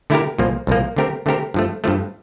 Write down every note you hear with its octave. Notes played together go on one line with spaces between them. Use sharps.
D3 A3 E4 G4 A#4
C2 A#2 F3 A#3
C2 A#2 F3 A#3
D3 A3 C4 G4 A#4
D3 A3 C4 G4 A#4
G2 F3 A3
G2 F3 A3